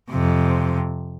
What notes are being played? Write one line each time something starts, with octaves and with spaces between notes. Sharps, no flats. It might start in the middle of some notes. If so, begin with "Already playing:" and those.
F2 C3